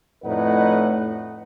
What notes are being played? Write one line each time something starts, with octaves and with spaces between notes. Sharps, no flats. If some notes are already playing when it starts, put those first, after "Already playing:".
F2 A2 D#4 B4 D5 F#5